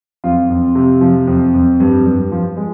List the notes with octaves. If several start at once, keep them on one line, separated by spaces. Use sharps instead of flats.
F2 F4
F2
C3
F3
F2
F2
G2
G2
F3
G#3